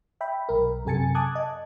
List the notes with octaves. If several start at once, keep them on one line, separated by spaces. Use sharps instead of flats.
E5 G5 B5
B1 A#4
F#2 C3 A4 G#5 A6 C#7
A5 D6 D#6 F#6 G#6
D#5